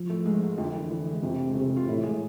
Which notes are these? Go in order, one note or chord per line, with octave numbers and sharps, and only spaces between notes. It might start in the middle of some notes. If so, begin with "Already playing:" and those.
Already playing: F3
A2 A3
G#2 G#3
G#2 G#3
F2 D3 F3
E3
E3
G#3
F2 C3 F3
G#3
A2 C3 A3
F4
A2 E3 E4
G#3 G#4